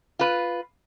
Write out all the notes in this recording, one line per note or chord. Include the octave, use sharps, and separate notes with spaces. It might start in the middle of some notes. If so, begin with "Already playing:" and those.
F4 B4